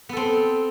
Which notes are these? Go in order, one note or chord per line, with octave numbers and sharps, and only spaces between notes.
B3 C4 A4